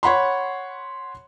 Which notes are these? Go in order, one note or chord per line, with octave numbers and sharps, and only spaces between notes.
C#5 F#5 B5 C6